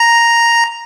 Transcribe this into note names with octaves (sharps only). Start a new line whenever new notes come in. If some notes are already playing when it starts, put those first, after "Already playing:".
Already playing: A#5